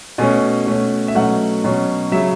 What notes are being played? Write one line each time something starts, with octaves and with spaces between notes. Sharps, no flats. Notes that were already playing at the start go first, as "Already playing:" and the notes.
B2 A3 C#4 G#5
B2 A3 C#4
E5
B2 F#3 A3 C#4 F#5
B2 F#3 C#4
C#3 F#3 E5